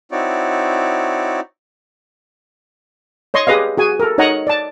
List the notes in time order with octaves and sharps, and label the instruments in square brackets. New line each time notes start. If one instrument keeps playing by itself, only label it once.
[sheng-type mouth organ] C4 D#4 E4 F#4 C#5 D5
[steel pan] C#5 D#5 C6 C#6
G4 G#4 B4 D#5 F5
F#4 G#4 G#5
A4 A#4
D#4 C#5 D#5 F#5 A#5
D5 A5